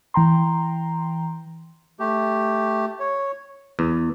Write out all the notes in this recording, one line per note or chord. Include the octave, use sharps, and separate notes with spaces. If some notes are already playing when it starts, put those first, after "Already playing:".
E3 G5 A#5 C6
A3 G4
C#5
E2